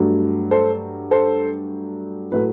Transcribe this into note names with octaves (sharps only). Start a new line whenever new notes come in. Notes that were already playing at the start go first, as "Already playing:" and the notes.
Already playing: G2 F#3 A3
A4 C5
A4 C5
A2 F#3 A3 B4